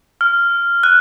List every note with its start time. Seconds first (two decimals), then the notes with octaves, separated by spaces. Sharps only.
0.21 F6
0.83 F#6